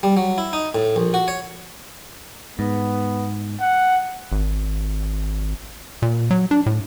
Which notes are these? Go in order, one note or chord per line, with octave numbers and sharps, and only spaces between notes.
G3
F#3
E4
D#4
A2
A#1
F#4
C#5
G#2 B3
F#5
G#1
A#2
F#3
D4
A2